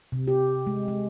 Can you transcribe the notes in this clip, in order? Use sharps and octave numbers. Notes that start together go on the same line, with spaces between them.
C3
G4
G#3
G#3